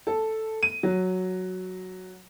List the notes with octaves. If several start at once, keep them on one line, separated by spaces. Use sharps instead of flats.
A4
D#7
F#3